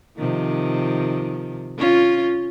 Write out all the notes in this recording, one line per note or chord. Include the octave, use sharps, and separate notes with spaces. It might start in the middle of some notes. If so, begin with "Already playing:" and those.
C3 D#3 F3
C#4 F4